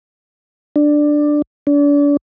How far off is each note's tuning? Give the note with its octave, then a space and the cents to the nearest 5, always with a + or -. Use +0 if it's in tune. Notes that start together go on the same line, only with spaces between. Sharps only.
D4 +10
D4 -35